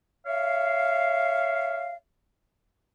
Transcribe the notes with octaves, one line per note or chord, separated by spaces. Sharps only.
C#5 E5 F5